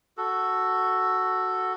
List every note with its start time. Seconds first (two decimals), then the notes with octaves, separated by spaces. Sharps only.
0.17 F#4 A4